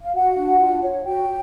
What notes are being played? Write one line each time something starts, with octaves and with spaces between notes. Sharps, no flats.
F5
F#4 F#5
D4
F4
C#5
F#4 G5